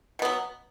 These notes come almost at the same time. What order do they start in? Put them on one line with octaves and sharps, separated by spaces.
B2 B3 F#3